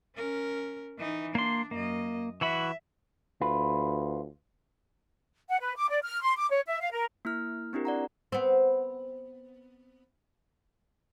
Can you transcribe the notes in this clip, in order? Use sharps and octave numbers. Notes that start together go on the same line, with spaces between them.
C#4 A#4
E3 D#4
A#3 D4 C6
F#2 A#3 D#5
E3 F#4 E5 B5
D2 F4 B4
F#5
B4
D6
D5
F6
C6
D6
C#5
E5
F5
A#4
A#3 E4 F6
C4 D4 E4 G4 A#4
D5 F#5 A#5
B3 C4